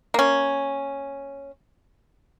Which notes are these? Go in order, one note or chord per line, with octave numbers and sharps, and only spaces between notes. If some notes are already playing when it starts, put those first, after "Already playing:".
A#3 C#4